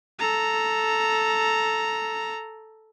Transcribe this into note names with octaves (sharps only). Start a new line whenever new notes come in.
A4 A#5